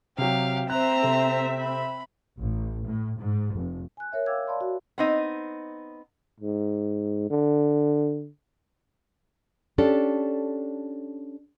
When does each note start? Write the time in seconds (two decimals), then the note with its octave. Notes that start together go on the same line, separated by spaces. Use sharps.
0.18 C3 F#3 G4 F5
0.70 C4 C5 E5 A#5 F#6
1.02 C3 A4
1.59 B5
2.39 A1
2.87 A2
3.19 G#2
3.54 F1
3.97 G#5 F#6
4.12 A#4 C#5 E5
4.26 F5 G5 D6 E6 G#6
4.47 D5 F5 A5 B5 C6
4.61 F#4
4.98 B3 C4 D#4
6.40 G#2
7.30 D3
9.78 C#4 D4 G4 A4